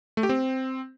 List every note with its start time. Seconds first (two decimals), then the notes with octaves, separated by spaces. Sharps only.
0.17 A3
0.23 G4
0.29 C4